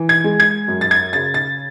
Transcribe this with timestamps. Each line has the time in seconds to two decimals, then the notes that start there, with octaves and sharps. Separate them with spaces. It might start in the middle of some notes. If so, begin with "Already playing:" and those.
Already playing: E3
0.09 G#6
0.24 G#3
0.40 G#6
0.68 F#2
0.81 A6
0.91 G#6
1.13 C#3 A6
1.34 A6